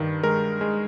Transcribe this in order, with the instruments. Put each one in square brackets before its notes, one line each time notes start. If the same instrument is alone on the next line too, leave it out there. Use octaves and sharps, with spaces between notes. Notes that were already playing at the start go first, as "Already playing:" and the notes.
Already playing: [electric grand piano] G2 D#3
G#3 A#4
G#3